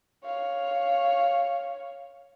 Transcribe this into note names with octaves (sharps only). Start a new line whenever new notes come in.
C#5 F5